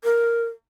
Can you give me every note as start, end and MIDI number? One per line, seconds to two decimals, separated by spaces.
0.04 0.44 70